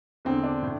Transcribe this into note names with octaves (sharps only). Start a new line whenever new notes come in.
E2 D3 C4
D4
A2